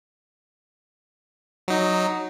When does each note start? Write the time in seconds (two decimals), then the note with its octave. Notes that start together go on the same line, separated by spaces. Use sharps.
1.68 F#3 D#4